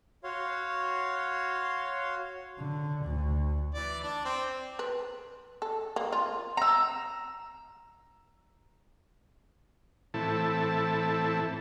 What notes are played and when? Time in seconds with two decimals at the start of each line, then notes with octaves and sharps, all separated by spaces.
0.24 F#4 C#5 F5 C6
2.58 D3
3.05 D2
3.74 E3 D5
4.03 D4
4.25 C4
4.79 B4
5.62 A4
5.96 A#3
6.12 F4
6.57 A#5 E6
10.14 A2 E3 C4 E4 A4 A5